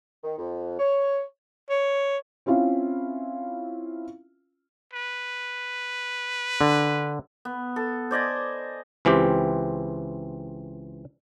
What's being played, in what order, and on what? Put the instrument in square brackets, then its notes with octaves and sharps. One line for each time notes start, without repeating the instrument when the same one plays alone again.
[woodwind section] D#3
F2
C#5
[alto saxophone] C#5
[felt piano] C4 C#4 E4 F4 F5
[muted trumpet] B4
[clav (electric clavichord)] D3
[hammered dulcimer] B3
A4
C5 D5 D#5 G#5
[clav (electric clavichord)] C#2 E3 C4 G4